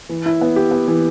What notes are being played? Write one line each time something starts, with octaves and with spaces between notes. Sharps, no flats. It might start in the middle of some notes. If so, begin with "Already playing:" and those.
E3
E4
B3
G4
B3
E3